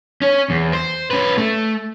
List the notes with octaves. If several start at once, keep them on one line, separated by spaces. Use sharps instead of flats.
C#4 C#5
E2
C5
C#4 B4
A3